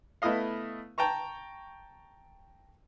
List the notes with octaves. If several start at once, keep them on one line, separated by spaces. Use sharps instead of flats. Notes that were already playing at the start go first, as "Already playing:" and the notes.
A3 B3 E4 D#5 F5
G5 A5 A#5 C#6